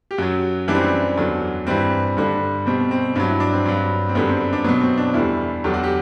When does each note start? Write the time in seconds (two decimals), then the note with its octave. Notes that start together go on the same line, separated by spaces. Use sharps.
0.11 G4
0.18 F#2 F#3 F#4
0.68 F#2 E3 G3 D4
0.75 C4
0.81 D4
1.17 E2 D3 F#3
1.67 G2 E3 G3 C4
2.17 G2 D3 G3
2.66 B2 G3 C4
2.91 C4
3.15 G2 F#3 D4
3.28 E4
3.40 D4
3.53 C4
3.66 G2 F#3
4.09 C4
4.15 F#2 D3 G3 B3
4.27 C4
4.53 D4
4.64 F#3 B3
4.69 B2
4.81 C4
4.97 D4
5.14 E2 D3 G3 E4
5.64 E2 D3 F#3 G4
5.74 F#4
5.84 G4